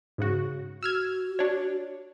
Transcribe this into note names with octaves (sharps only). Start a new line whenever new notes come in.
G#2 C#3 F#4
F#4 E6 F6 G#6
D4 C#5